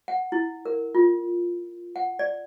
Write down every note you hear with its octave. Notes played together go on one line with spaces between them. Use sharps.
F#5
E4
A#4
F4
F#5
D5